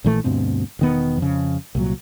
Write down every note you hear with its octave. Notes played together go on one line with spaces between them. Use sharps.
A#1 A#2 E3 A3
D2 G2 B2 C4
E1 D#3 B3
F2 C#3
C2 A#2 F#3